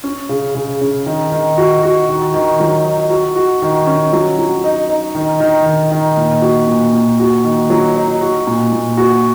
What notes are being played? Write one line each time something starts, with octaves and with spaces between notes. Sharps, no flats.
C#4
C#3
C#3
C#3
D#3
D#3
F#4
F#4
D#3
D#3
F#3
D#4
F#4
F#4
D#3
C#4
F#3
F#3
D#4
D#4
D#3
D#3
D#3
D#3
A#2
F#4
A#2
A#2
F#4
D#3
F#3
D#4
F#4
A#2
A#2
F#4